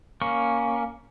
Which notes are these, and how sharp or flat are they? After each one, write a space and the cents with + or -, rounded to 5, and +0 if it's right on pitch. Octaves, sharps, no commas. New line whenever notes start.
A#3 +0 C#4 +5 C#6 +0